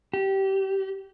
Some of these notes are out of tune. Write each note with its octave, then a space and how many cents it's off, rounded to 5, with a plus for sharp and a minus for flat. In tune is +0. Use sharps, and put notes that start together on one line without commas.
G4 -20